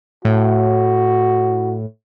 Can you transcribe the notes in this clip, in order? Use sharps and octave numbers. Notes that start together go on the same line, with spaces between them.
A2 F#4